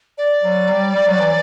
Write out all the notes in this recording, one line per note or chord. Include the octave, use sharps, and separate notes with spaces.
D5
F#3
G3
G3
F#3
E3